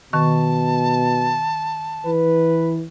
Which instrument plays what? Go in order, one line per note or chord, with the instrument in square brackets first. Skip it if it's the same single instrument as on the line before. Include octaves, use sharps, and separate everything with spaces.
[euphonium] B2 [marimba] D#3 C#6 [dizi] A5
[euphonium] E3 [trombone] B4